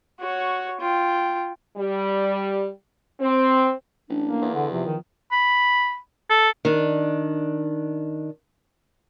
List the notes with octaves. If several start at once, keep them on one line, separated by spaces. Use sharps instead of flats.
F#4 C#5
F4 G5
G3
C4
A1 D4
A#3
E2
D3 F#5
C3 F3
D#3
B5
A4
D#3 D4